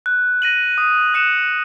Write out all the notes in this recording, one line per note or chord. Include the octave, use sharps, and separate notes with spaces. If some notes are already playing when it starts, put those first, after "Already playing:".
F#6
A#6 D#7 F#7
D#6
F#6 C#7 E7